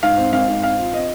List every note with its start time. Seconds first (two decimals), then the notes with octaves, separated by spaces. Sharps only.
0.03 G#2 F5
0.18 C4
0.33 G#1 F5
0.48 G#2
0.63 C4 F5
0.79 F4
0.93 C4 D#5